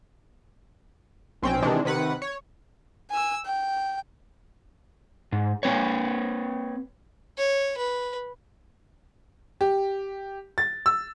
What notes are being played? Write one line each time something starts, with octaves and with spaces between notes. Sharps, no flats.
B1 C4 C#4 G5
C3 D#3 E3 G#3 D4
C3 D#3 B4 F#5
C#5
G#5 E6
G5
G#2
A#3 C4 B4 C#5
C#5
B4
G4
A6
E6